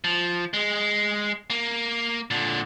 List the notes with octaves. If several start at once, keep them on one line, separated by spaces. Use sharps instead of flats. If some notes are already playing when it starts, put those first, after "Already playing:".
F3
G#3
A#3
A#2 D3